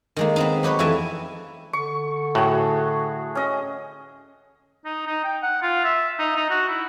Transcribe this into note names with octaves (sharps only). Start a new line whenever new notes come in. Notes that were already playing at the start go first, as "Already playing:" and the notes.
D#3 G#3 A#3
B3 C4 D#4
F#3 G4 B4 C#5
F2 E3 A4 E5 G#5
D3 C#6
A2 F#4 G#4
C#4 D#5
D#4
D#4
G5
F#5
F4
E5
D#4
D#4
F#4
E4